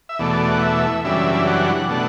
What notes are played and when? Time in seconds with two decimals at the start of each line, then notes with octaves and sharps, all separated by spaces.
0.09 E5
0.19 E2 B2 A3 D5
0.52 F#5
0.62 E5
1.04 F#2 C#3 E3 G3 D4 E5
1.47 F#5
1.89 B2 A3 D4 F#5